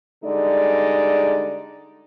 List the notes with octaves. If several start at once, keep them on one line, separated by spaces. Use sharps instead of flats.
D3 G3 G#3 D#4 A4 D5